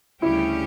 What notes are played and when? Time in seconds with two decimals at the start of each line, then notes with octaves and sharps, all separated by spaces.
0.22 D2 C#3 G3 C#4 E4 G4